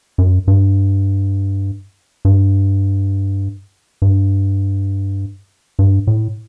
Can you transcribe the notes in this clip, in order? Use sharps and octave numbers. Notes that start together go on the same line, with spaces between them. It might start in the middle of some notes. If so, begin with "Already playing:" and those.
F#2
G2
G2
G2
G2
A2